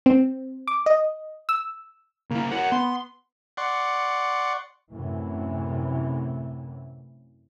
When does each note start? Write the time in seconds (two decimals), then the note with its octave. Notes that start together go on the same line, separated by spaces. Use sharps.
0.06 C4
0.68 D6
0.86 D#5
1.49 E6
2.31 C#3 A#3 E4
2.51 A#4 C#5 F#5
2.72 B3 C6
3.57 D5 F#5 C6 C#6
4.93 F#2 A2 C3 E3